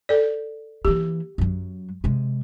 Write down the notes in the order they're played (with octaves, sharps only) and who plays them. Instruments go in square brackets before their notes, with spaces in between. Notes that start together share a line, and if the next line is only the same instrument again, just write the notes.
[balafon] A4 D5
[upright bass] E3 A#3 [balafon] G4
[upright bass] F#2 F#3
C3 G#3